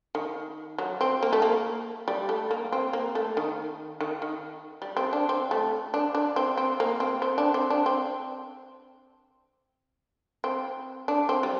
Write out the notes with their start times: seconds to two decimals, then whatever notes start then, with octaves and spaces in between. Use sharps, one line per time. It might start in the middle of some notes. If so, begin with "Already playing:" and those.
0.15 D#3
0.78 F#3
1.01 C4
1.23 A#3
1.33 A3
1.42 A#3
2.08 G3
2.29 A3
2.51 A#3
2.72 C4
2.93 A#3
3.15 A3
3.37 D#3
4.01 D#3
4.22 D#3
4.82 G3
4.97 C4
5.13 D4
5.29 C4
5.51 A3
5.94 D4
6.15 D4
6.36 C4
6.58 C4
6.80 A#3
7.00 C4
7.22 C4
7.38 D4
7.54 C4
7.70 D4
7.86 C4
10.44 C4
11.08 D4
11.29 C4
11.43 G3